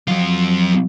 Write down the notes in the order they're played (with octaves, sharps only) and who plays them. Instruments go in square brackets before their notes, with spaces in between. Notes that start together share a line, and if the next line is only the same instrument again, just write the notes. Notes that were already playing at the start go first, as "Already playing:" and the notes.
[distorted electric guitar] F2 F4 [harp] F#3